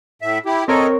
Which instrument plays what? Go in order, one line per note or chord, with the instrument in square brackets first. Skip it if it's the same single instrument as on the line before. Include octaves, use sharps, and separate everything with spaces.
[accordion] A2 E5
E4 G4
[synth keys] C4 A#4 C#5 [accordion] A4 D#5